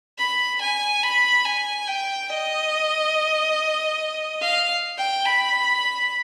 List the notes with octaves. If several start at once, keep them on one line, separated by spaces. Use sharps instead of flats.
B5
G#5
B5
G#5
G5
D#5
F5
G5
B5